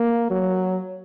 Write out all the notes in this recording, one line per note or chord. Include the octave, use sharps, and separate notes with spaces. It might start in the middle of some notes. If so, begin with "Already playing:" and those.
Already playing: A#3
F#3